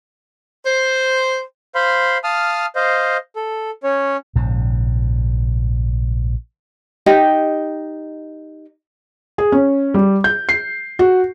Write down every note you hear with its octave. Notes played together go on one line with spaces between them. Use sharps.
C5
C5 F5 B5 C6
F5 A5 D#6 F6
C5 D#5 F5
A4
C#4 C#5
A#1 G#2 C#3
D#4 G4 D#5
G#4
C#4
G3
G6
C7
F#4